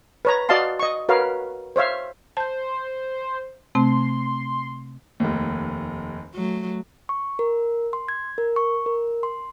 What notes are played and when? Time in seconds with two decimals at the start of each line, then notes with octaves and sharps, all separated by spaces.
0.25 B4 C#5 A#5
0.49 F#4 D5 D#5 F5 A5 C6
0.79 D#5 C#6
1.09 F#4 A#4 B4 C#5 F5
1.76 C5 C#5 E5 F5
2.37 C5 A5 G6
3.75 C3 A3 C4 C6
5.20 F1 D#2
6.34 F#3 A3
7.09 C#6
7.39 A#4
7.93 C6
8.08 G#6
8.38 A#4
8.56 C#6
8.86 A#4
9.23 C6